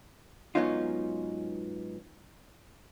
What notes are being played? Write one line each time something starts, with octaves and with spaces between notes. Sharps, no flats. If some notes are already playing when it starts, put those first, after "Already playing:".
G#2 F#3 B3 C#4 D#4 F4